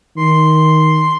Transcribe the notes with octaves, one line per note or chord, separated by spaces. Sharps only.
D#3 C6